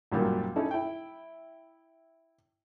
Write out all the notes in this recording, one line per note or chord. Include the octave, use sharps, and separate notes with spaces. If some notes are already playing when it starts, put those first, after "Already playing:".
G#1 F#2 A#2 G3 A#4
C#4 D#4 E4 A4
E4 G5